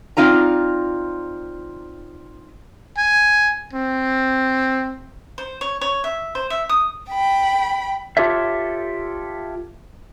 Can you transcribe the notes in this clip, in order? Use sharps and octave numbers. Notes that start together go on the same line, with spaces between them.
C4 D#4 F4 D5 A#5
G#5
C4
C5
C#5
C#5
E5
C5
E5
D#6
G5 B5
F4 G4 A4 C#5 E5